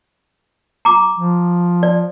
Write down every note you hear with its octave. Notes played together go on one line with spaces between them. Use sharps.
A#5 D6
F3
D5